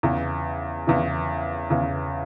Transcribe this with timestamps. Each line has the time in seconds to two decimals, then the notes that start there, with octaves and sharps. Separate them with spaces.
0.03 E2 C#3 E3
0.87 E2 C#3 E3
1.70 E2 C#3 E3